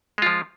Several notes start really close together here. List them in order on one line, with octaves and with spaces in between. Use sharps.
G#3 F4 F3